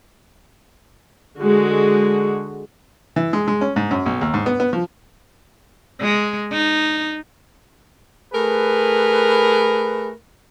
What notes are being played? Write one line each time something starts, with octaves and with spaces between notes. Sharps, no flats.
D3 G#3 F#4
E3
G#3
G#3
C#4
G#2
F#2
B1
D#2
G#2
B3
B3
F3
G#3
D#4
A3 G#4 A#4 B4